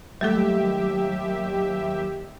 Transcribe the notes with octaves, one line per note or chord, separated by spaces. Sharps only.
D#2 F#3 G3 A3 G4 A4 E5